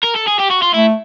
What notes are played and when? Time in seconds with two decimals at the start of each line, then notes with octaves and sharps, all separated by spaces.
0.03 A#4
0.15 A4
0.27 G#4
0.39 G4
0.50 F#4
0.62 F4
0.74 A3 E4